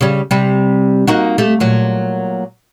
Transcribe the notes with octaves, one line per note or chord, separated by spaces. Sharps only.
C#3 G3
C3 G3
A#3 D#4 F#4
A3 G4
A#2 F#3